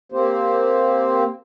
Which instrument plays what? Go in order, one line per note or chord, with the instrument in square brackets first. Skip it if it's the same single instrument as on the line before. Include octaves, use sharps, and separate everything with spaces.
[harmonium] A#3 C4 G4 C5